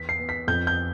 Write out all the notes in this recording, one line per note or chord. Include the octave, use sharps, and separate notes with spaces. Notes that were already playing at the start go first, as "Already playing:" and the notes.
Already playing: E2 B3 B6
C7
B3
B6
F2 G6
G6